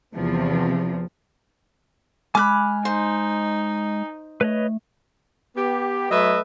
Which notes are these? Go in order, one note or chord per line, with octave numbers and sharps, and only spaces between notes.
E2 C3 F3
G#3 G#5 B5 D6 F6 F#6
D#4 C5
A3 B4 C#5 D#5
B3 G4
F#3 A3 B4 D#5 E5